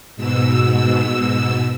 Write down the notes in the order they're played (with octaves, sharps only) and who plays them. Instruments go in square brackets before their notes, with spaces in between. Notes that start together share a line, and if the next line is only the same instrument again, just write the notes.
[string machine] G#2 B2 E6